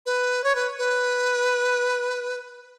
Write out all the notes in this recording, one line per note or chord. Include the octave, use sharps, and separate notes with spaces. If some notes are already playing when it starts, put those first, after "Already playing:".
B4
C#5
B4
B4